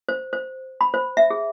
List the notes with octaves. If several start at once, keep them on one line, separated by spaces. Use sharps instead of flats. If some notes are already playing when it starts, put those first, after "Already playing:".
C5
C5
B5
C5
E5
G#4